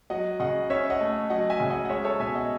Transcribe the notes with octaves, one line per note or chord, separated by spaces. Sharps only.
F#3 D#5 F#5
C#3 D#5 F#5
C#4 C#5 E5
D#5 F#5
A3
F#3 D#5 F#5
E5 G#5
C#3
D#5 F#5
F#5
G#3 C#5 E5
A4 C#5
B2 E5 G#5
D#5 F#5